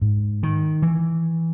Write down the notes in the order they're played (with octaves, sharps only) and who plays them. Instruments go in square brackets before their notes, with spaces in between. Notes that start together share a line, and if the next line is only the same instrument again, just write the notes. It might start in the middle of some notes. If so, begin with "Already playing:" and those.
[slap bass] G#2
D#3
E3